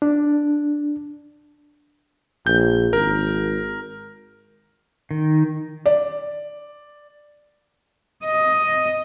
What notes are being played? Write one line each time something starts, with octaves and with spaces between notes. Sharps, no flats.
D4
A#1 G6
G#1 A#4
D#3
D5
D#5